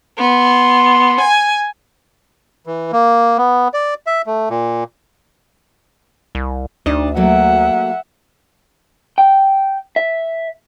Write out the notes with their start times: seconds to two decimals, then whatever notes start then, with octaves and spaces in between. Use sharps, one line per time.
0.19 B3 C6
1.21 G#5
2.66 E3
2.92 A#3
3.38 B3
3.74 D5
4.06 E5
4.26 A3
4.50 A#2
6.35 C2
6.86 D2 D4 D#4 D#5
7.16 F#3 A3 A#3 E5 F#5
9.18 G5
9.96 E5